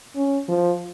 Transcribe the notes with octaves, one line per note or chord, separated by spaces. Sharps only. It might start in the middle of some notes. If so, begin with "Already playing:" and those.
C#4
F3